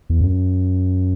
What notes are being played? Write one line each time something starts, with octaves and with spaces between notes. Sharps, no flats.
E2
F#2